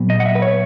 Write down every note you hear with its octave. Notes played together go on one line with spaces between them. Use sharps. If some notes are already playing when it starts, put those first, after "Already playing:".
Already playing: A#2 F#3 B3
D#5
F#5
E5
B4
C#5